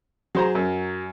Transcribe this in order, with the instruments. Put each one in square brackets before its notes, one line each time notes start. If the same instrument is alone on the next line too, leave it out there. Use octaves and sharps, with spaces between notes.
[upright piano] F#3 [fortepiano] G#4 C5 A#5
[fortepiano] F#2